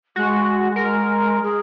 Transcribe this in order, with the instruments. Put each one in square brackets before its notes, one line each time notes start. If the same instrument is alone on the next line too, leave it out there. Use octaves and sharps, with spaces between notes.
[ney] G#3 [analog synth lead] F#4
[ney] G#3 [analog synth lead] A#4
[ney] G#4